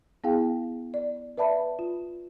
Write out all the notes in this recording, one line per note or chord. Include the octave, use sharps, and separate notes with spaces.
B3 E4 G#4 F5 G5
D5
B4 D5 E5 A5 B5
F4